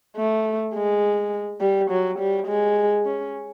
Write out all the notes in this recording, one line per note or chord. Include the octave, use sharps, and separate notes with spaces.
A3
G#3
G3
F#3
G3
G#3
C#4